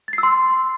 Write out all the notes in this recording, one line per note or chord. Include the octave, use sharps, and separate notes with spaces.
A6
C7
E6
C6